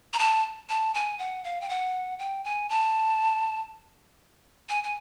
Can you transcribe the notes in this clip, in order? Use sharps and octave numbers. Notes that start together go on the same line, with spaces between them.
A#5
A5
A5
G#5
F#5
F5
G5
F#5
G5
G#5
A5
G#5
G#5